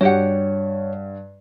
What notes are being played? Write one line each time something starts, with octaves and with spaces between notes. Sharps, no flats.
G2 F#4 G4 C#5 F#5